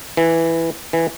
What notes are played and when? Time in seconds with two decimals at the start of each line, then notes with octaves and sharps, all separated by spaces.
0.17 E3
0.93 E3